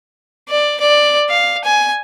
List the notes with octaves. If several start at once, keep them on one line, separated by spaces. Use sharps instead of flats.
D5
D5
F5
G#5